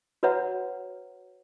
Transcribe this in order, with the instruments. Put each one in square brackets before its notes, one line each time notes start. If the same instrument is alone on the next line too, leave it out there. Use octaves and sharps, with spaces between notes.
[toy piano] F#4 B4 C#5 E5 F#5 A#5